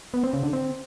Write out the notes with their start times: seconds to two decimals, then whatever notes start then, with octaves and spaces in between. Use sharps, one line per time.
0.14 B3
0.24 C4
0.33 C#3
0.43 D3
0.53 C4